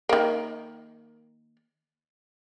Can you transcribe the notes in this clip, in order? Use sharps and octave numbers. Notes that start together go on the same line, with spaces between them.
D#3 A#3